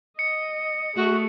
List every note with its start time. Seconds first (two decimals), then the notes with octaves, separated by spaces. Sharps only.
0.19 D#5 C#7
0.96 A3 F#4 G#4